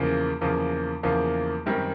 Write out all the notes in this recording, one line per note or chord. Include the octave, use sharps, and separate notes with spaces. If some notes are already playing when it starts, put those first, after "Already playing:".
Already playing: E2 C#3 F3 A#3
E2 C#3 F3 A#3
E2 C#3 F3 A#3
F#2 D#3 G3 C4